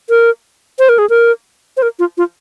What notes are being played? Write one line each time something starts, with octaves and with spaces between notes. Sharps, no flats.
A#4
C5
A#4
G#4
A#4
C5
A#4
F4
F4